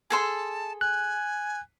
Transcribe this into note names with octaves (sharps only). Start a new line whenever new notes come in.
G#4 A4 A5 C6
G#5 F#6